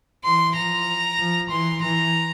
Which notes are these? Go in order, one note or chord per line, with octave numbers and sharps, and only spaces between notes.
E3 C6
F3 A#5
F3
E3 C6
E3 A#5